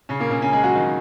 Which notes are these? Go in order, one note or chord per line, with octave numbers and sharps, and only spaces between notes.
C#3 C#4
A#2 A#3
C#3 C#4
C#3 C#4
G#3 G#4
F#3 F#4
D#3 D#4